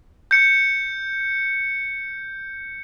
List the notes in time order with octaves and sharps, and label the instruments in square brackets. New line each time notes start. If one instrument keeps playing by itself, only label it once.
[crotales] G6 C#7